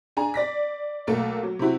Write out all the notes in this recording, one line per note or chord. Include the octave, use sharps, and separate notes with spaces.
D4 G#4 G#5 A#5
D5 A#6 B6
B1 A3 A#3 A4
F#3
C3 C4 E4 F#4